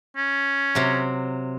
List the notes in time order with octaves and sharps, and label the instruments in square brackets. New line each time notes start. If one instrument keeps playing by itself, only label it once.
[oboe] C#4
[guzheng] C3 F#3